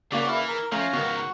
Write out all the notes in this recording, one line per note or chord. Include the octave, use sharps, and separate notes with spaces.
C#3 E3 A#3 F#4 D5
E4 F5
A#4
F3 A3 C#4 F5 A#5
C#2 G#2 D#3 B3 F#4